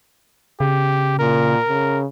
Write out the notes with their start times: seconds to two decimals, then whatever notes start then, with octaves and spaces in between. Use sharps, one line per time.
0.60 C#3 G4
1.19 A#2 A#4
1.68 C#3